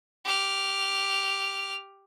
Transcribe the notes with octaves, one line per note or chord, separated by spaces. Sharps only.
G4 F6